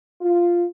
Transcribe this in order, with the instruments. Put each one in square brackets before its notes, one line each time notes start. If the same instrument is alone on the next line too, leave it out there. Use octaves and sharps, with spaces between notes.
[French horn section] F4